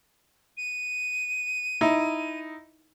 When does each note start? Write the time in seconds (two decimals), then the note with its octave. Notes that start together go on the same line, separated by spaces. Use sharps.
0.57 D#7
1.81 D#4 E4